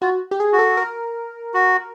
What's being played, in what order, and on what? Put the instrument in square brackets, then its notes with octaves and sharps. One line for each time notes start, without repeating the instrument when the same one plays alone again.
[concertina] F4 [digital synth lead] F#4
[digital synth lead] G4
G#4
[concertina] F#4
[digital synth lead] A4
A#4
[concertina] F#4